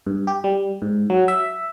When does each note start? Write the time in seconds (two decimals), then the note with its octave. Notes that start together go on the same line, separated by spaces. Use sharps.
0.06 G2
0.27 G4
0.44 G3
0.82 G#2
1.10 F#3
1.28 E5